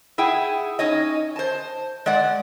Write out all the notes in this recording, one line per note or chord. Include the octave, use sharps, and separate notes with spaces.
E4 G#4 F#5 G5
C#4 D#4 C#5 D#5
C5 A5
G#3 D5 F#5